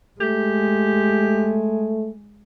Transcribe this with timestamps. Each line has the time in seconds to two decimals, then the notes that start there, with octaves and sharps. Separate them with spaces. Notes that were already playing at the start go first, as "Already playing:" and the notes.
0.21 G#3 A3 G4